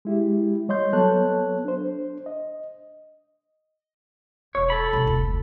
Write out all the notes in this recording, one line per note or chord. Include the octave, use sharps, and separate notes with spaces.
G#3 E4 G4
G3 C#5 D#5 C6 G6
F#3 B3 A4 C#5 A5 F#6
D4 C5
D#5
E1 C#5
A4 B5
C3 A#3
F1 D2